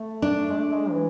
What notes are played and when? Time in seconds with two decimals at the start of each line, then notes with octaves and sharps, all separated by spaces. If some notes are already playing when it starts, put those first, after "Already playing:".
Already playing: A3
0.22 D4
0.51 G#3
0.57 A3
0.73 G#3
0.90 E3